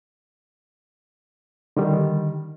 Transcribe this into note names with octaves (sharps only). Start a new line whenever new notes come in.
D3 D#3 G3